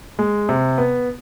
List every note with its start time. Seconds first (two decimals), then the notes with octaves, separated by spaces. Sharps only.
0.19 G#3
0.49 C3
0.78 B3